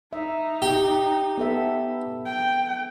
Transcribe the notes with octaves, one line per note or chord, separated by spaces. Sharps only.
D#4 E5
G4
B3 A4 E5
G5